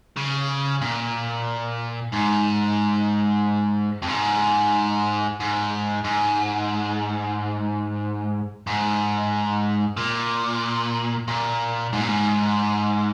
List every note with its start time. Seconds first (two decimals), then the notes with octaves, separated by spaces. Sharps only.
0.17 C#3
0.81 A#2
2.13 G#2
4.02 F2
4.09 G#2
5.40 G#2
6.04 G#2
8.67 G#2
9.97 A#2
11.28 A#2
11.93 G#2
12.01 A#2
12.08 G#2